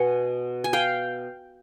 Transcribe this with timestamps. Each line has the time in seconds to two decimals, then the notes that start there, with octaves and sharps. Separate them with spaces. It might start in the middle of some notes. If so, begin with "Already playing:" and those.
Already playing: B2 F#5 G#5
0.64 G#5
0.73 F5 G5